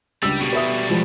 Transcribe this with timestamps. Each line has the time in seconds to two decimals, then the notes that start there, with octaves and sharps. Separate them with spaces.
0.23 C#2 G3 D4 E6
0.41 B2 G3
0.53 B4 E5 D#6
0.90 F3 G#3